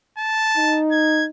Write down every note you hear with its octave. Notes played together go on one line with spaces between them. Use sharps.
A5
D#4
G#6